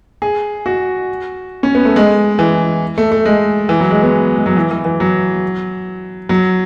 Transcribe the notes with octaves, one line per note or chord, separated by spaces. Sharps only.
G#4
F#4
C#4
B3
A3
G#3
E3
A3
A3
G#3
E3
F#3
G#3
B3
G#3
F#3
E3
E3
E3
F#3
F#3